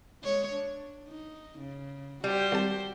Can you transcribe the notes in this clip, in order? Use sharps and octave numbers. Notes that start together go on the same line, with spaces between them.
G#3 C#5
D4
D#4
C#3
G3 F#4 G4 C5
C2 A5